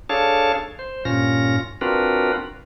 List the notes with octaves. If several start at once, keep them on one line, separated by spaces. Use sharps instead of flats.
D4 G#4 A4 C#5 F5 A5
C5
G2 A#2 C#4 F4 A#6
C4 D4 F4 F#4 A#4 B4